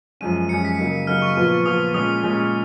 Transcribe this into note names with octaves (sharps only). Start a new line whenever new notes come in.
F#2 F3 G#3 C#4 D#7
F#2 F3 G#3 C#4 C#7
B6
C#3 F#3 A#3 D#4
C#3 F#3 A#3 D#4 F6
C#6
A#2 F3 B3
A#2 F3 B3 D#6
A#2 G#3 C#4 D#6
A#2 G#3 C#4